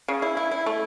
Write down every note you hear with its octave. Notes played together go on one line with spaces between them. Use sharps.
C#3
E4
E4
E4
A3